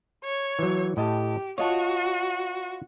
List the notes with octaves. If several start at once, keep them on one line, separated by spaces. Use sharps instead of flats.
C#5
E3 F#3
A2 G4 D#5 A5
F4 F#4 C#5 D#5 A5